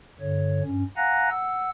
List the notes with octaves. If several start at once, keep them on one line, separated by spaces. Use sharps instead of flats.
G2 D3 C#5
G2 C#4
F5 F#5 G#5 A#5 F#6 A#6
F#5 E6